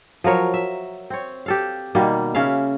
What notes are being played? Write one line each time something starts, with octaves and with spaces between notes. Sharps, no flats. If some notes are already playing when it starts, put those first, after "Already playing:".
F3 F#3 A#4 C#5
E5
C4 C#5
G4 A4 F5
B2 D#3 G3 A#3
C#3 C#4 E5 F5